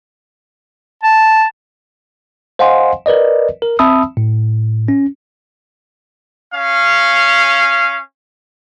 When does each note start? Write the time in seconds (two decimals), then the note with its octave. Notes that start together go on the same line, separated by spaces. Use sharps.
1.03 A5
2.59 C5 D#5 F5 F#5 G#5 C6
3.06 A#4 B4 D5 D#5
3.62 A#4
3.79 C4 E5 A5 B5 D#6 E6
4.17 A2
4.88 C#4
6.54 C#4 F5